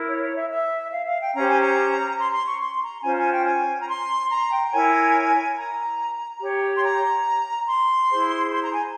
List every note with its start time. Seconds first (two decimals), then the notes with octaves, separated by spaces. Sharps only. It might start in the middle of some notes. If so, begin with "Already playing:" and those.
Already playing: E4 A#4
0.08 C#5
0.23 C#5
0.36 E5
0.50 E5
0.92 F5
1.06 F5
1.21 G5
1.34 C#4 G4 C5 A#5
1.47 G#5
1.61 A#5
2.19 C6
2.33 C6
2.47 C#6
2.61 C6
2.83 A#5
3.03 C#4 F4 C5 G#5
3.17 G#5
3.32 G5
3.46 G#5
3.81 A#5
3.88 C6
4.30 A#5
4.51 G5
4.68 G5
4.72 E4 A#4 C#5 G#5
5.56 A#5
6.41 G4 C#5
6.77 C6
6.83 A#5
7.67 C6
8.10 E4 G#4 C5
8.52 C6
8.62 A#5
8.72 G#5